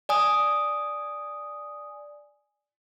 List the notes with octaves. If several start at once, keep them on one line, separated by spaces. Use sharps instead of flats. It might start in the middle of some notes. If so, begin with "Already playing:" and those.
D5 G#5 D#6